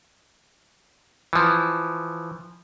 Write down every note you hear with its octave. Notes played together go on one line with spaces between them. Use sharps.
E3 F3